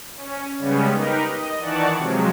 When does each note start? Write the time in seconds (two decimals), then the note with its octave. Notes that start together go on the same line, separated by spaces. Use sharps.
0.16 C#4
0.58 C#3 G3 G#3 B3 C#4
0.93 D#4 G4 A#4 B4
1.29 D#5
1.58 D#3 E3 D5 F#5 A5 C#6
1.95 C3 F3 F#3 G#3